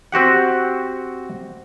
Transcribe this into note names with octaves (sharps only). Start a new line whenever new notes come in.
C4 F#4 G4 F#5